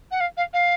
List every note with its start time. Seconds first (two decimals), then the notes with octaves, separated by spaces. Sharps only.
0.11 F#5
0.20 F5
0.37 F5
0.53 F5